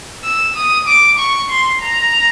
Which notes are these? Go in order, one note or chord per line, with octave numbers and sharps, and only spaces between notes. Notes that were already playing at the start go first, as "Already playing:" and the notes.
E6
D#6
D6
C#6
C6
A#5